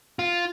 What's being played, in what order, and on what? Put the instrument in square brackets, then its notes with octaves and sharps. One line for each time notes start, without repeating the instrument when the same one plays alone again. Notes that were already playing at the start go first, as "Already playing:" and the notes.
[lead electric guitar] F4